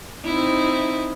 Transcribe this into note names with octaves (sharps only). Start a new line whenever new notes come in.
C4 D#4 E4